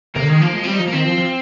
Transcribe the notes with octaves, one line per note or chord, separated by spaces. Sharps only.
C3 A#3
D3
D#3 G#3
F3 A#3
F3 G#3
G3 C4
D#4
F3
A#3
D#3 C4
F3
F3